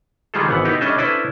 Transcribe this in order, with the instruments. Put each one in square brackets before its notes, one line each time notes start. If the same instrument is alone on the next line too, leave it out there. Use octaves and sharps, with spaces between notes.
[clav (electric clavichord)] D#3 G3 G#3 F4 G#4 A4
G#1 E3 B3 F#5
B3 D#4 E4 G4
G3 C#4 D4 A4 D#5 E5
C#4 D4 E4 A4 B4 C5